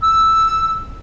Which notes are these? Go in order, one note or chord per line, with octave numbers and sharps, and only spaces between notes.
E6